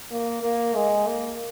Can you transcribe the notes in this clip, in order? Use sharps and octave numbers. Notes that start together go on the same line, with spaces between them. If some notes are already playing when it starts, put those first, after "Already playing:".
A#3
A#3
G#3
A#3